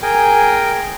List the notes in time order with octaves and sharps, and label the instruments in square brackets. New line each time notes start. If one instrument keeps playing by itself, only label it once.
[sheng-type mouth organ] G#4 A#4 G5 G#5